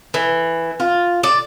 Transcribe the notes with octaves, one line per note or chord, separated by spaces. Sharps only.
E3
F4
D5